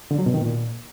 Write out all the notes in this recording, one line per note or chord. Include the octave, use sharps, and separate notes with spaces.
D3
F#3
B2
D#3
A#2